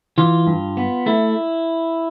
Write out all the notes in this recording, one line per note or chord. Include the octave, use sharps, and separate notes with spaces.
E3 F4
G2
B3
A3 E4